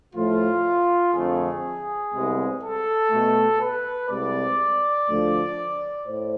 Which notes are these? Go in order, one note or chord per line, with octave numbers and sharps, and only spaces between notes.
A2 F3 A3 F4
F2 D3 A3 G#4
C2 C3 G#3 B3
A4
B2 A3
B4
C2 C3 G#3 D5
D2 D3 F3 A3
A2 C5